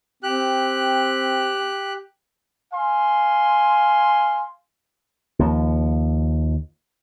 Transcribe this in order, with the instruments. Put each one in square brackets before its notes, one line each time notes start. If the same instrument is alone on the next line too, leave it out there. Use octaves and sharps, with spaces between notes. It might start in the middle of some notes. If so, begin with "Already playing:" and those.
[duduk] C4 [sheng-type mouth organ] G4 F#6
[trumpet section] F5 G#5 C6
[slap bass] D#2 F3